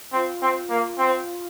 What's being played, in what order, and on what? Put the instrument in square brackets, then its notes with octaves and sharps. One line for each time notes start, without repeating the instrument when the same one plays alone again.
[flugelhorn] C4 [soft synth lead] F4
[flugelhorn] C4
A#3
C4